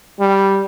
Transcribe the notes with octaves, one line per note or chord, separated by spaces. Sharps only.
G3